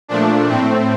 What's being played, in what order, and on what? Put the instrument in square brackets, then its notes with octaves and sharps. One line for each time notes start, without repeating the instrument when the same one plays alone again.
[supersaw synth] A#2 F3 A3 D4
A2 A3 C4